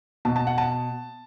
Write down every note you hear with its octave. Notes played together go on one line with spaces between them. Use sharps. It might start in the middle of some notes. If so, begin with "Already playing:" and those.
B2 A5
A5
F#5
A5